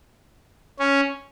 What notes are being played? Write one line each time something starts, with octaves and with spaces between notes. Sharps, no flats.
C#4